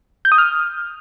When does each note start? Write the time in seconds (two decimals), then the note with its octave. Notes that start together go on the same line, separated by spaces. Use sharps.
0.25 G6
0.32 D#6
0.38 F6